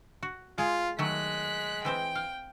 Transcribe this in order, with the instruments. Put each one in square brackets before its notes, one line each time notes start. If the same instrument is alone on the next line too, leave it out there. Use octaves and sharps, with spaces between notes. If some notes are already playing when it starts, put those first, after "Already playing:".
[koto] F#4
[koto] G#3 G#4 [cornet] F4
[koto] D#3 F#3 A3 [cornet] G#3 [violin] F#6 B6
[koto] E3 C4 C5 [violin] G5
[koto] F5